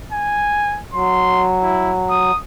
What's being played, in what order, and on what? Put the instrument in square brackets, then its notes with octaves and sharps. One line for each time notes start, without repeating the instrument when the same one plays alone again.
[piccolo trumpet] G#5
[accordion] F#3 [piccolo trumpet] C6
[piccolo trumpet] E4
D#6